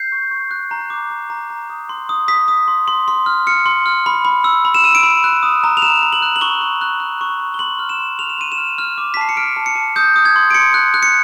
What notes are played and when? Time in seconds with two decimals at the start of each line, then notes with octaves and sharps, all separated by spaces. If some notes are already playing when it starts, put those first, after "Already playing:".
Already playing: G6 C7
0.12 C#6
0.31 C#6
0.51 F#6
0.71 A#5
0.90 D6
1.11 A#5
1.30 A#5
1.50 A#5
1.70 D#6
1.89 C6
2.09 D#6
2.28 D#6 B6
2.48 D#6
2.68 C6
2.88 C6
3.08 C6
3.26 F6
3.47 F6 C#7
3.66 C6
3.86 F6
4.06 B5
4.25 B5
4.44 E6
4.65 B5
4.74 E7
4.84 E6 D#7
4.95 D7
5.03 B5
5.24 F#6
5.43 D#6
5.64 A#5
5.77 F7
5.82 A#5 E7
6.02 A#5
6.13 F#7
6.22 F#6
6.36 F#7
6.41 C#6 G7
6.61 C#6
6.81 F#6
7.00 F#6
7.21 C#6
7.40 C#6
7.54 G7
7.59 C6 F#7
7.79 F6
7.89 E7
8.00 C6
8.19 F6 F7
8.29 E7
8.39 C6 D#7
8.52 E7
8.58 F6
8.78 F6
8.98 D6
9.14 B6
9.17 A5 C7
9.29 C#7
9.37 F6 D7
9.56 A5
9.66 C#7
9.76 A5
9.96 D#6 G6
10.16 D#6
10.25 G#6
10.36 C6
10.50 D7
10.54 C6 C#7
10.74 F#6
10.94 F#6
11.03 C#7